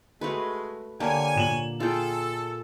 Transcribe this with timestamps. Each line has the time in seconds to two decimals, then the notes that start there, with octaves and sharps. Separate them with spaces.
0.21 G#3 A3 F#4 B4
1.00 D3 A#3 G4 C#5 G#5 A5
1.35 A#2 E7 F#7
1.80 F4 G#4 A4 G5